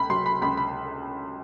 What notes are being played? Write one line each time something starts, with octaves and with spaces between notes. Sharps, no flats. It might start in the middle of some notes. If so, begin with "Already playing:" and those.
Already playing: C#2 B5
F#3 C6
B5
C#2 B5
B5